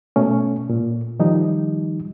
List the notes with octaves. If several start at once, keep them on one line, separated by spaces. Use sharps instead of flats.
B2 A3 C#4
A#2
D#3 F3 G3 D#4